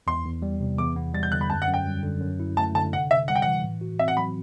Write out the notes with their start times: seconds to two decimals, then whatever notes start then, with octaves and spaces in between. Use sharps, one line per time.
0.07 E2 C6
0.25 E2
0.42 G3
0.60 C3
0.78 E2 D6
0.96 B3
1.14 G3 A6
1.23 G6
1.32 D3 F#6
1.41 B5
1.50 F#2 A5
1.62 F#5
1.68 F#2
1.74 G5
1.86 G3
2.03 D3
2.21 F#2
2.40 E4
2.57 A3 A5
2.75 D3 A5
2.93 C3 F#5
3.11 C3 E5
3.28 G3 F#5
3.36 G5
3.42 E3 F#5
3.64 A2
3.81 F#4
3.99 C4 E5
4.08 F#5
4.17 F#3 B5